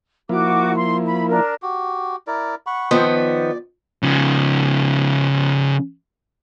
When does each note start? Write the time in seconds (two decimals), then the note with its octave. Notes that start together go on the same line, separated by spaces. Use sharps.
0.29 F3 A#3 E4 F#4 D6
0.75 C6
1.06 B5
1.28 D4 A#4
1.63 F#4 G4
2.27 E4 A#4 D5
2.66 F#5 B5 C#6
2.91 D#3 F3 B3 C4 C5 C6
3.16 D5
4.03 C#3 F3